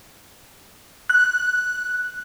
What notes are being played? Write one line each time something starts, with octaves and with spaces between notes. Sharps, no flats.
F#6